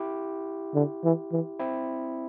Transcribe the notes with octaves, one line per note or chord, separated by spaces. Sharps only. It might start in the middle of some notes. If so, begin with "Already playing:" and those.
Already playing: E4 G4
D3
E3
E3
C4 E4